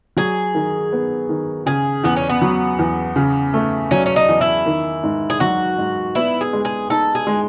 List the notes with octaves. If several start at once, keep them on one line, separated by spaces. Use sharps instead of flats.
F#3 G#4
D#3
B3
D#3
C#3 G#4
E2 B3
C#4
B3
F#3
E2
C#3
A3
F#3 C#4
C#4
D#4
E2
E4
D#3
G#2
G#4
F#3 F#4
G#2
B3 E4
G#4
G#3
G#4
D#4 A4
G#4
G#3